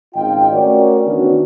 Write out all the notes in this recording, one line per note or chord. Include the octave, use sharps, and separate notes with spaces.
G#1 C#3 F4 D#5 G5
A3 C#4 F#4 A#4 C#5 D5
D#3 E3 B3 C#4 D4 F#4